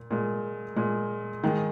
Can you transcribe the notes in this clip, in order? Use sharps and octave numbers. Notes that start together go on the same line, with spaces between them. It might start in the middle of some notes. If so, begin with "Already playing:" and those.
Already playing: A#2
A#2 G#3
A#2 G#3
D#3 G#3